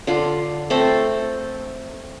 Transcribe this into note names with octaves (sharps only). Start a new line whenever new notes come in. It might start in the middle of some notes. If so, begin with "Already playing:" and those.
D3 F4
A3 C4 A4